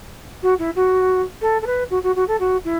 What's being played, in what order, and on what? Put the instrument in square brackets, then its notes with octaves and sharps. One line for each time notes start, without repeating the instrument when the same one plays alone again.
[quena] F#4
E4
F#4
A4
A4
B4
F#4
F#4
F#4
A4
F#4
E4